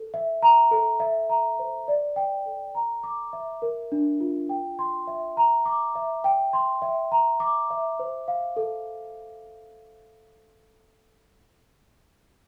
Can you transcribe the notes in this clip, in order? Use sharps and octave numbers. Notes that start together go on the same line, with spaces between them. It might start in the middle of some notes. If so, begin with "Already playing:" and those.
Already playing: A4
E5
A#5
A4
E5
A#5
C5
D5
G5
A4
A#5
D6
E5
A#4
D4
F4
G5
C6
E5
A#5
D6
E5
G5
C6
E5
A#5
D6
E5
C5
F5
A4